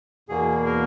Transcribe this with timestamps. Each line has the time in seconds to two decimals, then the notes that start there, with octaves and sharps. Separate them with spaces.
0.29 E2 B2 A#3 G#4
0.66 A#4